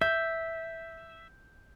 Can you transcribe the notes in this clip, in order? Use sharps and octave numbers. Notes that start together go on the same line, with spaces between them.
E5 G6